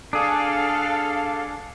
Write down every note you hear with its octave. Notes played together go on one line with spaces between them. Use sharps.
D4 G#4 A4 F5